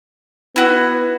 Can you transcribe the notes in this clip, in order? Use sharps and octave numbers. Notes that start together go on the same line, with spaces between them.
B3 E4 F#4